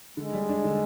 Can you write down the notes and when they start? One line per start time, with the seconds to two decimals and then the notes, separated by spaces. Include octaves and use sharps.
0.17 D3 G#3
0.33 G3
0.49 D4
0.64 D3